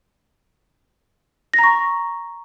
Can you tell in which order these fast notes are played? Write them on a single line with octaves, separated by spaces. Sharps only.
A#6 A#5 C#6